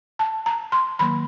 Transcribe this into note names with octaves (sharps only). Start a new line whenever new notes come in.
A5
A#5
C6
D#3 F#3 A#3 B5